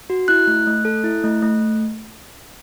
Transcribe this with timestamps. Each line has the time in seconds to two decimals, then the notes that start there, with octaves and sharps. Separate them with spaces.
0.10 F#4
0.28 E4 F#6
0.47 A3
0.67 A3
0.85 A4
1.04 E4
1.24 A3
1.42 A3